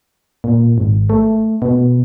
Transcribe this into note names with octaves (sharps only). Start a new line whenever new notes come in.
A#2
G#1
A3
B2